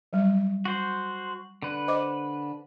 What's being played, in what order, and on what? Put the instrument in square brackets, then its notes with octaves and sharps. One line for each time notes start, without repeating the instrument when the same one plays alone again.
[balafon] F#3 G3
[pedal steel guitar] F#4 C5
D3 B4
[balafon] C5 D#5 D6